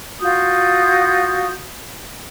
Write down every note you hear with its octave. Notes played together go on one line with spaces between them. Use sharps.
F4 F#4 D#6 G6